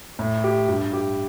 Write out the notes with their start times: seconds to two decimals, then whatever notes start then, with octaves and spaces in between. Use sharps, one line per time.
0.19 A2
0.44 G4
0.68 G2
0.93 G4